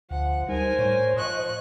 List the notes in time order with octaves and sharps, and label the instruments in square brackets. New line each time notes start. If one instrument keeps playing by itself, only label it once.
[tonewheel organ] D2 [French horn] F3 [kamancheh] F#5
[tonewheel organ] G3 D#4 [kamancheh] A#4 G#5 [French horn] C5
[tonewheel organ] A2 C#5
[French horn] F3 [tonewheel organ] C5 D#5 [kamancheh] C#6 F#6